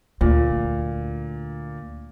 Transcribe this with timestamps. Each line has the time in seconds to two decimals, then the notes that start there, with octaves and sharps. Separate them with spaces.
0.21 D2 A#2